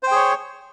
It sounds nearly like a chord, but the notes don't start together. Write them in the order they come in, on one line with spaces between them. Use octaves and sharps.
C5 G5 G#4 C#5